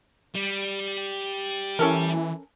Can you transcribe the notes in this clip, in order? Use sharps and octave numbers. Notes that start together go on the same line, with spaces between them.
G3
E3 C#4 A4 A#4